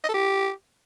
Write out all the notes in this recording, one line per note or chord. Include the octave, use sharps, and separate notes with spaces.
D#5
A4
G4